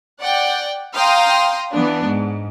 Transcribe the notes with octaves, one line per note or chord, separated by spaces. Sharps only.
D5 F#5 G5
F5 G5 A#5 C6 D#6
E3 B3 D4
G#2